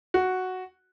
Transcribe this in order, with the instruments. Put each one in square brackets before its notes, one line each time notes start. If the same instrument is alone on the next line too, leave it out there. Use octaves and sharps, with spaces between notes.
[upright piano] F#4